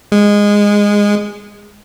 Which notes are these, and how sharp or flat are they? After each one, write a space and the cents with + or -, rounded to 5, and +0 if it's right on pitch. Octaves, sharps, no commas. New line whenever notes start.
G#3 -15